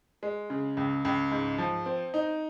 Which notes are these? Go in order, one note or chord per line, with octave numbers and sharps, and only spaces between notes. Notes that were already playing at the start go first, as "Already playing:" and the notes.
G#3
C#3
C#2
C#2
G#2
F3
C4
D#4